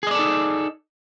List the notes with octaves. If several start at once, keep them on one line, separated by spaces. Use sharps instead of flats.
D#4 G#4 A4 D5 D#5